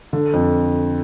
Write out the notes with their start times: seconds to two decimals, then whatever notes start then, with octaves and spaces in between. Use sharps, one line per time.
0.13 D3
0.34 F2